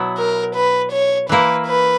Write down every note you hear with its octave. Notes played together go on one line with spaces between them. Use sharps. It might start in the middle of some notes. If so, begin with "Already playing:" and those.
Already playing: B2 F#3 B3 E4
A#4
B4
C#5
E3 A#3 E4 B4
B4